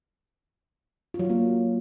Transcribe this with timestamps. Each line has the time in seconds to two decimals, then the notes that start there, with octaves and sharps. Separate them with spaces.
1.14 F4
1.19 F#3
1.25 F4
1.30 A#3